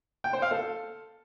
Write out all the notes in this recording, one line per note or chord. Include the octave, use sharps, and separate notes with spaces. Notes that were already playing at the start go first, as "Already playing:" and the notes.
G5
C5
F5
A4